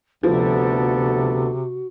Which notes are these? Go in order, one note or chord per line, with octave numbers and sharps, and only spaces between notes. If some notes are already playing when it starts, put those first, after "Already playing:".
D2 C3 F3 B3 F#4 A4